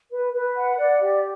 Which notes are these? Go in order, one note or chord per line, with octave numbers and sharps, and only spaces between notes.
B4
B4
F#5
D5
G4